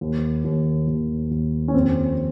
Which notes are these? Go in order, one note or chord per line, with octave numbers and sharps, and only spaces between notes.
D#2
D#2
D#2
D#2
C#4
F2 C4